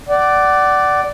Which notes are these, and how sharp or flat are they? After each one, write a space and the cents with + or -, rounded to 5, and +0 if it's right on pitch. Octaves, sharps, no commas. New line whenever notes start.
D5 +0 F#5 +30